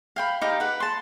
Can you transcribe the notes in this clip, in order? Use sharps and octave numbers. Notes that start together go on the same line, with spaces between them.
F5 G5 B5
D#4 G4 F5
B4 F#5
A5 C6